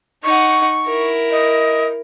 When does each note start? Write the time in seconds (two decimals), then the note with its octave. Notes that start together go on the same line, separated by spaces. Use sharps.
0.24 D#4 F#5 C#6
0.87 E4 A#4
1.31 D#5